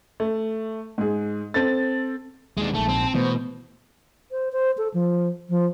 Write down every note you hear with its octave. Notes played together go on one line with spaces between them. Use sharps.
A3
G#2 G#4
C4 A4 A6
D#2 G#3 D4
A#1 G#2 A3 A5
C4
B2 E3 A3 B3 C5
C5
C5
A4
F3
F3